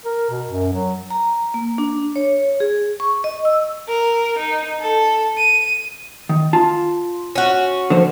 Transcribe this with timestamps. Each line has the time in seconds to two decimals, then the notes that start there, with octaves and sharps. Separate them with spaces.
0.05 A#4
0.30 B2
0.48 F#2
0.73 F#3
1.11 A#5
1.54 A#3
1.78 D4
2.16 C#5
2.60 G#4
3.00 C#6
3.24 D#5
3.45 E6
3.89 A#4
4.39 D#4
4.81 A4
5.38 D#7
6.29 D#3
6.53 F4 A5
7.36 C#4 F#4
7.90 D3 F3 C5